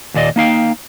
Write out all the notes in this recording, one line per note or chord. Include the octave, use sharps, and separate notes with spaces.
D#2 A#2 D5 D#5
A#3 D#4 F5 G5